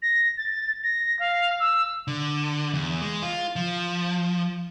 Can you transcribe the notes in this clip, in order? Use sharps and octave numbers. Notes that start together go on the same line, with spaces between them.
A#6
A6
A#6
F5
E6
D3
E2
G#3
F4
F3